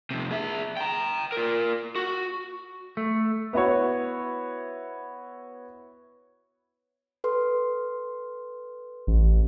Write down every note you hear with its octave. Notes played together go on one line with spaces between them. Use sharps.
F2 C3
G#4 E5
G5 A#5
F4 A#4
F#4
A3
B3 E4 F#4 C#5
A4 B4 C6
A1